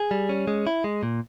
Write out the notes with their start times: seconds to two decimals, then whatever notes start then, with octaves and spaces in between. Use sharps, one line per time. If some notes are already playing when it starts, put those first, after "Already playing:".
Already playing: G#4
0.11 G3
0.29 C#4
0.47 G#3
0.67 E4
0.84 G#3
1.03 A#2